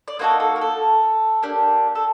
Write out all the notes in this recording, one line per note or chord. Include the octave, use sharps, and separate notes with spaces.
D5
A#3 D#4 F#4 A4 C5
A4
A#4
A4
A#3 D4 G4
A4